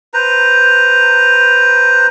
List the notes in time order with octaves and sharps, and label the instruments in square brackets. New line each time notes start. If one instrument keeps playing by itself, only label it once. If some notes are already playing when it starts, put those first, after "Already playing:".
[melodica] B4 C5 A#5